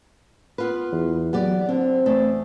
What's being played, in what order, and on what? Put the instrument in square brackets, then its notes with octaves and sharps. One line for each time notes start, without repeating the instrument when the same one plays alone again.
[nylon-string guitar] B3 F4 B4
[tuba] E2
[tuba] F#3 [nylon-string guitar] B3 G4 D5
[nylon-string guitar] D3 [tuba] C4
[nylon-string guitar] E2 A3